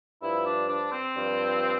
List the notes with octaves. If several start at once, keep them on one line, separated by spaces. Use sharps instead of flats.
G2 F3 E4
D4
D4
C4
G2 F3